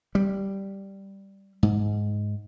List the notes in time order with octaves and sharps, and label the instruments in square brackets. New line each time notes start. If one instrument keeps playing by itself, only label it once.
[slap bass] G3
G#2